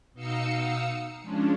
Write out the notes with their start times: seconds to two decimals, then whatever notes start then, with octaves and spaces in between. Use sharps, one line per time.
0.13 B2 D#4 D#5 F5 E6 C#7
1.21 F3 G#3 C#4 D4